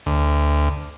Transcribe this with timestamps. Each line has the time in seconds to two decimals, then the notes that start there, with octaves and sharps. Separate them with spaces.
0.06 D2